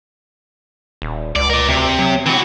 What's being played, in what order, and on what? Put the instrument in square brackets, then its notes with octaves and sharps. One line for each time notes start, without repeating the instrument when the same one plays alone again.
[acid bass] D#1
[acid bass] C#2 [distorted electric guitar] D5
[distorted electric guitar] A#4 D5
[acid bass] D2 [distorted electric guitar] C3
[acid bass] F#3
[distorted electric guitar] E3 F#4 [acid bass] C4